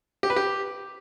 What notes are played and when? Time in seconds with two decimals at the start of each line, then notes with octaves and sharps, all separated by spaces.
0.23 G4
0.30 B4
0.36 G4